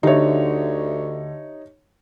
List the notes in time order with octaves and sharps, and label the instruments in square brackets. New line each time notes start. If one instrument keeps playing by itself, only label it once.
[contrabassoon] D2 [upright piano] D3 [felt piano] D#4 C#5 [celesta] G4 E5